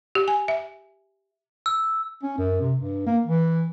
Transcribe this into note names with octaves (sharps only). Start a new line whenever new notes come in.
G4
G#5
E5
E6
C#4
F#2
C3
G2
A#3
E3